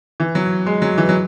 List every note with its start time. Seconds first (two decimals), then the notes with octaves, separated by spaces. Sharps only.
0.20 E3
0.35 F#3
0.66 G#3
0.82 F#3
0.98 E3
1.09 F#3